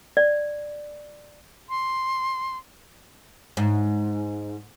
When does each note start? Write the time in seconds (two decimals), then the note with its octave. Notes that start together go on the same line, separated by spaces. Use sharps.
0.17 D5
1.70 C6
3.57 G#2